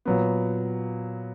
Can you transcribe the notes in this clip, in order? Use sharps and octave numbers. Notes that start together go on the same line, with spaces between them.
A#2 F#3 B3